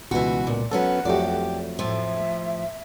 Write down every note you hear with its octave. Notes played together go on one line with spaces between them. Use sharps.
C#2 B2 E3 F#4
A#2
F#3 B3 C#4 A4 B4 F#5
F2 F#3 A3 G4 D5
A2 F3 E5